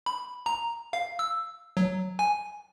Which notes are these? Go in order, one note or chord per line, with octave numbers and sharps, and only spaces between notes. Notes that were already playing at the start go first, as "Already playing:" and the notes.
B5
A#5
F5
E6
F#3
G#5